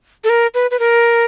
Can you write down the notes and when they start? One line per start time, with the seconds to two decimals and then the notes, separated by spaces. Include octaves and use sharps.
0.24 A4
0.29 A#4
0.54 B4
0.71 B4
0.79 A#4